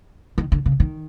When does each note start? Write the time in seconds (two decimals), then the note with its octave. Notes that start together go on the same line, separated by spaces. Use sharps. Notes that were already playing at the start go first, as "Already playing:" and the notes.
0.38 D#3
0.52 D3
0.66 C#3
0.80 D#3